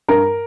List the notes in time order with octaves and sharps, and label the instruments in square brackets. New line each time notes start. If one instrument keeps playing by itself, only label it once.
[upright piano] G2 A#4